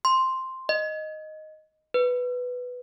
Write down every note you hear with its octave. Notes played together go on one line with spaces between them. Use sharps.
C6
D#5
B4